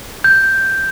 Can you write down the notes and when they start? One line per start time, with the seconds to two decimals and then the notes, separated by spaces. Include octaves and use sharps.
0.24 G6